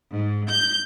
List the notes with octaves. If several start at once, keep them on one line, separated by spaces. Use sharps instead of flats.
G#2
G6